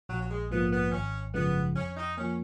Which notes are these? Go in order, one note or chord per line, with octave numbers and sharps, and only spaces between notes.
A#1 F#3
F#3
G#3
G#2 F3 A#3 B3
B3
G#1 C#4
F#2 C#3 F3 G#3 B3
F2 C#4
D#4
F3 A#3 C#4